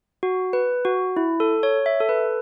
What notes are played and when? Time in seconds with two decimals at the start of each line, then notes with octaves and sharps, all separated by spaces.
0.23 F#4
0.53 B4
0.85 F#4
1.17 E4
1.40 A4
1.63 C#5
1.86 E5
2.00 A4
2.09 B4